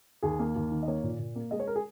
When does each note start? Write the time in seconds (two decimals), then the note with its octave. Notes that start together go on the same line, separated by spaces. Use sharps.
0.22 D#2 G#4
0.39 A#3
0.56 D#2
0.71 D#3
0.83 D#5
0.88 A#3 C#5
1.03 A#2
1.19 A#2
1.36 A#3
1.51 G#3 D#5
1.60 C#5
1.67 A#4
1.76 G#4